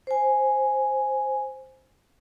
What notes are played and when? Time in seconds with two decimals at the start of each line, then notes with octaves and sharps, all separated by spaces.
0.07 C5 G#5